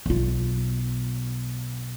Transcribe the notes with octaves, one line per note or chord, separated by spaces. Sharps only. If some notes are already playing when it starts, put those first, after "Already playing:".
B1 F4